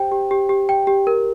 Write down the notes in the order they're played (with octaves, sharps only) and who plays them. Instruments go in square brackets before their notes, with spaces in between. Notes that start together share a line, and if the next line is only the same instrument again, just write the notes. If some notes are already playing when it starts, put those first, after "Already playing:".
Already playing: [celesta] G4 C5 G5
G4
G4
G4
G5
G4
A#4